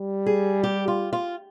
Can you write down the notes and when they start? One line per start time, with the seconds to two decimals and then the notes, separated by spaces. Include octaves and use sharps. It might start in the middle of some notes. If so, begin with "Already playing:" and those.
Already playing: G3
0.26 G#4
0.64 G4
0.88 F4
1.13 F4